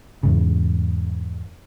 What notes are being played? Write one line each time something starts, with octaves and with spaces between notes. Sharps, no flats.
E2 G#2 C#3